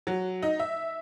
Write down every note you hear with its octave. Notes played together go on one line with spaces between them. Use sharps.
F#3
D#4
E5